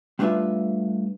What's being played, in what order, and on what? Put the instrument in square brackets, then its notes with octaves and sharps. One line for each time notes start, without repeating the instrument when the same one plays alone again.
[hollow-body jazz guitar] G3 A3 D4 F4 B4 E5